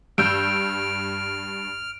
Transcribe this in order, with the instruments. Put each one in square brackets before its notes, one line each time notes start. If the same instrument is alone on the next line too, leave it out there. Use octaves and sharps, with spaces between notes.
[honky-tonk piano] G2 E6 G6 [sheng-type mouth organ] F6 [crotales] D7